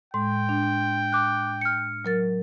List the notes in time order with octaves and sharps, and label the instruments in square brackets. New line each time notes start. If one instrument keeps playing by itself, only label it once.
[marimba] A2 G#3 [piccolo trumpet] G5 [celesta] C6
[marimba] D4
[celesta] D6 F#6
F6 C#7
[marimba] F#3 A#4 A6